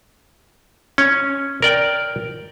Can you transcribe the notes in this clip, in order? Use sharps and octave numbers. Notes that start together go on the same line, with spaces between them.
C#4
A#4 D5 G5